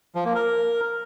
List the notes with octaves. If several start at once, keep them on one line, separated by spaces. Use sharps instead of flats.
F3
A#3
A#4